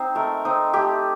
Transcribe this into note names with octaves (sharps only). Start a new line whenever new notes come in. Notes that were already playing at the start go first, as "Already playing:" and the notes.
Already playing: C4 D#4 C5
A3 A#4
C4 D#4
A3 G4